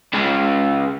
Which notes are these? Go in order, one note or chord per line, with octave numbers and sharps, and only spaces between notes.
C#2 G#3